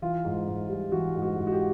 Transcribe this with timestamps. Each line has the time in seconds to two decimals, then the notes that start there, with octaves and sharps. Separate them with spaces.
0.02 E3 F4
0.25 G#2
0.47 G#2
0.69 G3
0.92 E3 F#4
1.15 G#2
1.22 F#4
1.37 G#2
1.47 F#4
1.52 G4